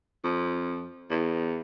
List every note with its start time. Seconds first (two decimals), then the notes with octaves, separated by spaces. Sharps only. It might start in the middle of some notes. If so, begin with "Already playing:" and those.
0.24 F2
1.10 E2